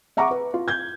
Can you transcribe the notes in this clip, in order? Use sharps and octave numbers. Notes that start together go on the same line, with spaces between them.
E5 F#5 A#5 C#6 D6
B4
F4
G6 G#6